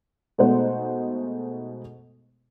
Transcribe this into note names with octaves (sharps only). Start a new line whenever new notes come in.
B2 G#3 A3 D#4 C5 F#5